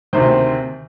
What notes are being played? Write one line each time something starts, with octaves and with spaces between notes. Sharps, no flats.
D2 C3 D#3 C5